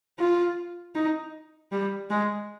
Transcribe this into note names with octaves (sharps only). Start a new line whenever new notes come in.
F4
D#4
G3
G#3